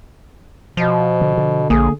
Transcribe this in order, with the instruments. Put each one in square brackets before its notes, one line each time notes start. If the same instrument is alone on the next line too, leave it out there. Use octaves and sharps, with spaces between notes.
[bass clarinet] B2 [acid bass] F3
[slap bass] D3
D3
[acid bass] A#1 [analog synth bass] A#3 [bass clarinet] G#4